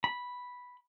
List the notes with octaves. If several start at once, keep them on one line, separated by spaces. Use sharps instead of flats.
B5